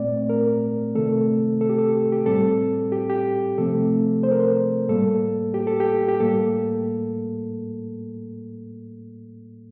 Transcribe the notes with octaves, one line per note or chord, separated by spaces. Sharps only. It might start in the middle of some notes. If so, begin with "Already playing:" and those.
Already playing: A#2 A3 C4 D5
A#4
C3 D#3 A3 C4 A4
A4
G4
A4
G4
A2 G3 C4 A4
G4
G4
C3 F3 A3 C4 A4
C5
A#4
C5
A2 G3 A#3 A4
G4
A4
G4
G4
A2 G3 A#3 A4